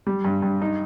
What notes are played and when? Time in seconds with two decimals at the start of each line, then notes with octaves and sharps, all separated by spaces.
0.07 G3
0.25 G2
0.42 G2
0.62 D#4